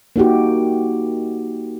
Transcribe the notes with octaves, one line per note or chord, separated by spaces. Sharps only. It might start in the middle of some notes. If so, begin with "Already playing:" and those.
A#3 D#4 F#4 G4